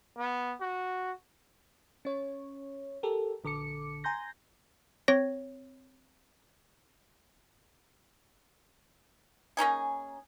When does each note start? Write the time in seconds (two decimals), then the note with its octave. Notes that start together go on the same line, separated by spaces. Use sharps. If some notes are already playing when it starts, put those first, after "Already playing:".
0.18 B3
0.61 F#4
2.05 C#4 C#5
3.03 G4 A4 A#4
3.44 A#1 D3 A4 D6 C#7
4.04 G#5 A#5 C6 G6 A#6
5.08 C4 C#5 A#6
9.57 A#3 C#4 D#4 G#4